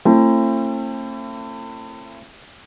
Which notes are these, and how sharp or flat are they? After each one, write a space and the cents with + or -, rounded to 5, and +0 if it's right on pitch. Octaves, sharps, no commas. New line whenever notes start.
A3 +35 C4 +40 E4 +40